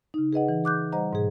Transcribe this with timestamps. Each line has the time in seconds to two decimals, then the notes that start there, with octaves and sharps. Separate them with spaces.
0.14 C#3 D#4
0.33 G#4 B4 D#5 F#5
0.49 E3
0.64 G#4 D6 F#6 G6
0.92 G3 C5 D#5 F#5 A#5
1.13 G#2 B2 G#4